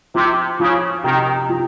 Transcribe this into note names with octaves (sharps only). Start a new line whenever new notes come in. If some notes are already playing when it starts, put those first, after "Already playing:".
C3 F3
C#3 F3
C3 D#3
F3